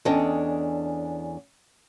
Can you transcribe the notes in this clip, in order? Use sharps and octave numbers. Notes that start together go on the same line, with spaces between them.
E2 C#4 D4 A4 D#5 G5